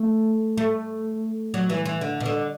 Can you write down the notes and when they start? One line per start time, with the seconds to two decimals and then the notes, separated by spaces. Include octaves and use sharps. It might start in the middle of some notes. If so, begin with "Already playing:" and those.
Already playing: A3
0.57 A3
1.54 F#3
1.70 E3
1.85 E3
2.01 D3
2.20 B2
2.25 D3